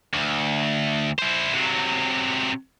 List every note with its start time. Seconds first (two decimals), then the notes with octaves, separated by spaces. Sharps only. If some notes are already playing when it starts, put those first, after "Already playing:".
0.14 D2
1.19 E4 C5
1.54 C3 F#3